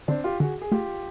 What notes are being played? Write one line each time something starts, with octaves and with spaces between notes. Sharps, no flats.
D3 C4 D4
F4 G4
D3 F#4 G#4
G#4
A3 F4 G4